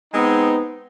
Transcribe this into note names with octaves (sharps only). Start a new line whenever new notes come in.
G#3 B3 C4 D#4